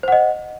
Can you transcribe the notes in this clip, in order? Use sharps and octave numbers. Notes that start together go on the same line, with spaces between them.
C5 D#5 F#5